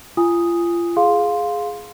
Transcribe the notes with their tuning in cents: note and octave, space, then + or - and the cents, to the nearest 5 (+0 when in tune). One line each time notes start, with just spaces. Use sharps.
F4 -30 G#5 -15 D#6 +0
G#4 +5 F5 +10 C6 +0